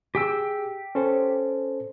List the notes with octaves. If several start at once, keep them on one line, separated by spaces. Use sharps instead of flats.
G4 G#4 G5 E6
C#4 A4 C5